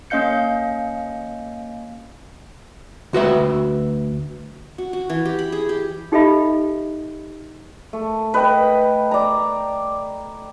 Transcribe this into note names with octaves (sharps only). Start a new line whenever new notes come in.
A#3 C#4 D#5 F5 G6 C#7
D2 F#4 B4 E5
F#4
F#4
E3
G4
B5
G#4
G4
D#4 G4 A4 D#5 E5 B5
A3
B4 D#5 G5
D5 A#5